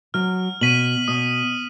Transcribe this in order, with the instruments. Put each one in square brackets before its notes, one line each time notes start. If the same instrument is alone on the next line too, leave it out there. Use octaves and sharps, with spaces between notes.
[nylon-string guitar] F#3 [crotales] F6
[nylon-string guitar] B2 [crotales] B6 D#7 F#7
[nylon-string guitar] B2 [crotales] D#6